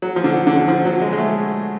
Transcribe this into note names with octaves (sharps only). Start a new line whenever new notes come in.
F#3
F3
D3
D3
D3
F3
F#3
G#3
G#3
A3